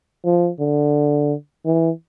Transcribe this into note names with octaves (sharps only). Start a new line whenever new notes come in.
F3
D3
E3